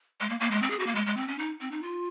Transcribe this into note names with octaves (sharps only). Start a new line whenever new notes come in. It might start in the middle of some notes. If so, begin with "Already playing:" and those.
G#3
A#3
A#3
G#3
C4
G#4
F#4
A#3
G#3
G#3
C4
C#4
D#4
C4
D#4
F4